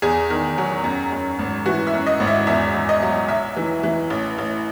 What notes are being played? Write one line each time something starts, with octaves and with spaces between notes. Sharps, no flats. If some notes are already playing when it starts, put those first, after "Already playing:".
E2 G#4
D#3
F#3
F#2
F#2
G#1
E3 F#4
E5
F#2
D#5
G#1
E5
E2 E5
E2
D#5
F#3
B1 E5
E3
E3
A1
A1